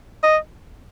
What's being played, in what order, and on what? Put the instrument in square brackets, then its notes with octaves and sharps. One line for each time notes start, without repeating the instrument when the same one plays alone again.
[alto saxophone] D#5